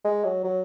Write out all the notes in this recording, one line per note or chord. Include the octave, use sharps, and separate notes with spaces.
G#3
F#3
F#3